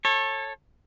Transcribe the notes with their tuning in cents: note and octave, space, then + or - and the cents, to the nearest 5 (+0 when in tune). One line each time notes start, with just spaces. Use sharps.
A4 +0 C#5 -30